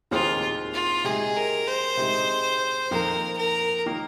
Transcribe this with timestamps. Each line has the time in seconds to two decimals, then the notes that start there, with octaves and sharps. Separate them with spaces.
0.11 D#2 D#3 C4 F4 G#4 C5
0.74 F4
1.04 C3 G#3 D#4 G#4
1.36 A#4
1.67 C5
1.97 C3 G#3 D#4
2.91 F2 D#3 A#3 A#4
3.37 A#4
3.86 D#3 A#3